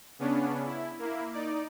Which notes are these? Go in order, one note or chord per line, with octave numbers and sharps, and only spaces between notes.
C#3 B3 C#4 D4
E4
A#3 E4
D#4 D5